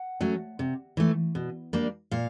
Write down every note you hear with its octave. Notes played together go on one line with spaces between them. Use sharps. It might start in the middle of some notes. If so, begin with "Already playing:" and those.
Already playing: F#5
F#3 A3 C#4
C3
E3 A3
B2
G3 A#3 D4
A#2 F5